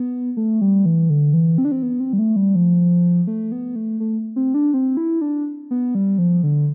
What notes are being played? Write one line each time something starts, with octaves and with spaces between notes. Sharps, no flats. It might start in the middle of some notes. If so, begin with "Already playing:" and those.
Already playing: B3
A3
G3
E3
D3
E3
C4
D4
C4
B3
C4
G3
A3
G3
F3
A3
B3
A3
A3
C4
D4
C4
E4
D4
B3
G3
F3
D3